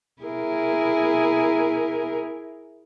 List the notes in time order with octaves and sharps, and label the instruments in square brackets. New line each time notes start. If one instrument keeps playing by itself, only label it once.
[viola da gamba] E4 G#4 A#4